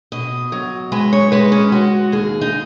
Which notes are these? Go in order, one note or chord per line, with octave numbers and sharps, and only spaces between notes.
B2 D#5
F#3
G#3 B4
C#5
G#3 B4
C#4
G#3 F#4
D#2 G#4
D#4